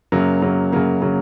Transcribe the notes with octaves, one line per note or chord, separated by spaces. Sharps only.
F#2 C#3 F#3 A#3
F#2 C#3 F#3 A#3
F#2 C#3 F#3 A#3
C#3 F#3 A#3